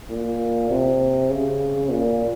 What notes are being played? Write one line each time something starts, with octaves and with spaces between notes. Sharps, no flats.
A#2
C3
C#3
A#2